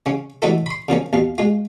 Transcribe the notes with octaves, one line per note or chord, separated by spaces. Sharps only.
C#3 C#4
E3 F#3 A3 D#4 E4 A4
B5 C6
C#3 F3 A#3 C#4
D#2 B2 F5
G#3 F4